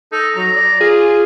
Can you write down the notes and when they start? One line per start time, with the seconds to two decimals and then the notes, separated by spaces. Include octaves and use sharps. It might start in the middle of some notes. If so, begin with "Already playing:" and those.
0.12 D#4 A4
0.36 F#3 A#5
0.56 D5
0.81 F4 G#4